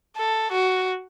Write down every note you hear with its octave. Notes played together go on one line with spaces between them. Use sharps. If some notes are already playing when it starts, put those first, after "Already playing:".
A4
F#4